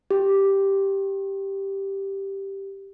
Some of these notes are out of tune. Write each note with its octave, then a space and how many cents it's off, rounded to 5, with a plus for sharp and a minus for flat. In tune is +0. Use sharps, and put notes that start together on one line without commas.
G4 +0